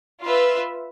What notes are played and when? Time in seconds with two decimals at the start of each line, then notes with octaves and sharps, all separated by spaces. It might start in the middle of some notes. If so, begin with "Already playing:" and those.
0.23 F4 B4 E5